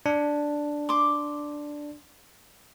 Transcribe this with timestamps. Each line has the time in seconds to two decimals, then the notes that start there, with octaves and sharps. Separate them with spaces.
0.06 D4
0.89 C6 D6